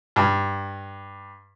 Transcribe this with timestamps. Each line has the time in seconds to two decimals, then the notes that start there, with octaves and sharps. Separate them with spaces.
0.16 G2